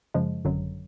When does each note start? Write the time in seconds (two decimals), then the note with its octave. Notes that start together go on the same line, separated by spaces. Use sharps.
0.14 F#2 C#3 F3 G#3
0.45 G#1 F#2 D3 F#3